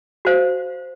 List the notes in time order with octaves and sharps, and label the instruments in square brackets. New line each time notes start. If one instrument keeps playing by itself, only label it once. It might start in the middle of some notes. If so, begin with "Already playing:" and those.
[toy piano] F#4 C5 F5